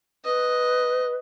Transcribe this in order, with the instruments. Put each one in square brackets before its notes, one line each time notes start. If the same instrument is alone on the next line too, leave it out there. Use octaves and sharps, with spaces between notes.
[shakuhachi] B4 [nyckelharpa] D#5